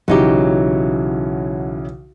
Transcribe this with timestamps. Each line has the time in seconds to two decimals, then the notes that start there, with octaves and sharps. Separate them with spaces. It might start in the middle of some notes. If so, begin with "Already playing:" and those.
0.08 B1 C#3 E3 F#3 D#4 G4